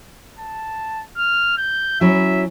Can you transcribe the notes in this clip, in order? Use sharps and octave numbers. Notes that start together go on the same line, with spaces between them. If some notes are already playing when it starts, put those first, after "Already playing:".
A5
F6
G6
F#3 C#4 E4 E5